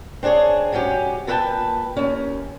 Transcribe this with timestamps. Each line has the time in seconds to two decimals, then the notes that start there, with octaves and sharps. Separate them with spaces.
0.23 C4 D4 G4 G#4 C#5
0.72 G#2 F#3 C#4 G4
1.27 A#2 A4 B4 D#5 G5 A5
1.97 D#2 C#4